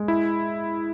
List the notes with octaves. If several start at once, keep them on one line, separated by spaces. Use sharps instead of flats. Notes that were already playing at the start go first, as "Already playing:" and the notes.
Already playing: G#3
E4